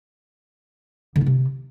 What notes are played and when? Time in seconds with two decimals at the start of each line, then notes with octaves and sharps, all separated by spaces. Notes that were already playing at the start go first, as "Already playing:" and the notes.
1.16 D3
1.21 F4
1.26 C3